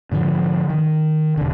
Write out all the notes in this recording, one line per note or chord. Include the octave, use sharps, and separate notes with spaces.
G#2 D3 E3 F3
D#3
E1 D3